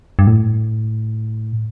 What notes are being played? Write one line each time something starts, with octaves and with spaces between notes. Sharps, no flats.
G2
A2